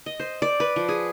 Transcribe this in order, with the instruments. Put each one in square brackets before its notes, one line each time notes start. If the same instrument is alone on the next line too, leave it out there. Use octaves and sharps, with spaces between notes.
[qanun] D#5
C5
D5
B4
F3
G#4